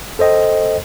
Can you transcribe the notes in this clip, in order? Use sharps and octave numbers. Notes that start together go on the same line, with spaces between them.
A4 C5 D#5 G5